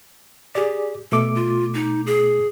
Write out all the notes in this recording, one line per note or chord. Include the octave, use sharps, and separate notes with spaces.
G4 G#4 D5
B2 A3 A4 D6
F4
D#4
G#4